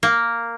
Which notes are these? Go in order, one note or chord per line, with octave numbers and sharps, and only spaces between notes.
A#3